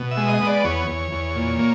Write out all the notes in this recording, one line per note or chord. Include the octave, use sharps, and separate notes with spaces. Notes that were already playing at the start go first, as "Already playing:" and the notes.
Already playing: B2
E5
G#3
D#5
B3
D5
E2 C#5
E2
E2
A#2
A#3